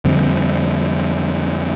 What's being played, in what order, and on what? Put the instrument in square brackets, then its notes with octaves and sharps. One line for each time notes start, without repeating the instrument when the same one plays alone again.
[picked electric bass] F2 D3 G3 C4